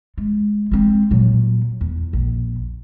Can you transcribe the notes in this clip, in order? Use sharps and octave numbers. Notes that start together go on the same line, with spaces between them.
G#3
G#3 C4
A#2 F#3
E2
A#1